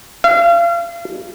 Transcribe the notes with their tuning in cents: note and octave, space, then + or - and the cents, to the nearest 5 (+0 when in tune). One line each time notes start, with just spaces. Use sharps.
F5 -35